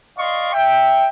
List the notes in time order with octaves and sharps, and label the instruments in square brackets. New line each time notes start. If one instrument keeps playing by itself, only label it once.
[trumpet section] D5 D#5 F5 C6 C#6
E5 G5